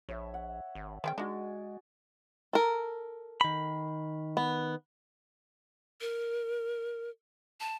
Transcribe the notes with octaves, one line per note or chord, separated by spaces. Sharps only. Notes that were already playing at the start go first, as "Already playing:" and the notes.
A#1 C#5 E5
F#5
G#1
D#3 G#3 C4 D5 G5
G#3 D4 D#4 F#4 G#4
A4 A#4
D#3 B5
B3
A#4
A5